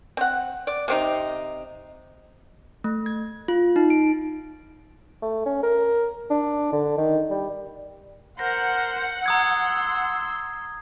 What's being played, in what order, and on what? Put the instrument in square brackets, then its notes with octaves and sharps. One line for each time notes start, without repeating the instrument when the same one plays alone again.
[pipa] C4 F#5
D5
C3 C4 D#4
[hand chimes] A3
G#6
F4
D#4
D7
[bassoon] A3
C#4
A#4
D4
D3
D#3
G3
[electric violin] A#4 C5 [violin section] F#5 [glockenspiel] A#6
[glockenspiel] A#5 D#6 G#6 [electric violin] C6 E6